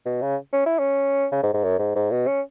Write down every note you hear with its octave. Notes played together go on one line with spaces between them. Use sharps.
B2
C#3
C#4
E4
C#4
C#3
G#2
G#2
F#2
G#2
G#2
B2
C#4